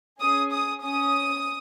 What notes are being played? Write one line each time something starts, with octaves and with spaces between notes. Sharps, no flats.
C#4 G#4 D#6
D#6
C#4 D#6